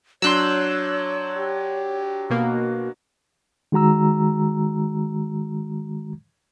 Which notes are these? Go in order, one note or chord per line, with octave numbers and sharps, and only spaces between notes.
F#3 D4 C#5 C6 E6 F#6 G6
G4
B2 A#3 F#4
D#3 G#3 F#4 A#5 E6